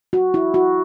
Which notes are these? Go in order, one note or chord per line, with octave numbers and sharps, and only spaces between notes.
F#4
E4
F#4